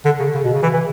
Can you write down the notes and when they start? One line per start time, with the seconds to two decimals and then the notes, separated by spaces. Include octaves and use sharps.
0.05 D3
0.20 C#3
0.35 C#3
0.44 B2
0.54 C#3
0.63 E3
0.74 E3